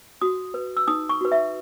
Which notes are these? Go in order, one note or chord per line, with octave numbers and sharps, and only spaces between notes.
F#4 D#6
B4
E6
D#4 D#6
C#6
F#4 B4
E5